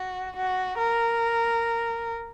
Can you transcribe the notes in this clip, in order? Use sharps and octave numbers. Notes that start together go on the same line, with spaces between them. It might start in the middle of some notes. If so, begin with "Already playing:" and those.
Already playing: F#4
F#4
A#4